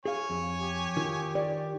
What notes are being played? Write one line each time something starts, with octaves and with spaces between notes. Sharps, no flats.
G#4 C#5 F5 G#5
F2
G4
D#3 F4
G4 D5